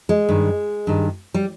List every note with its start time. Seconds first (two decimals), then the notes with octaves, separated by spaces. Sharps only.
0.09 G#3
0.29 G2 D#3
0.87 G2 D#3
1.34 G3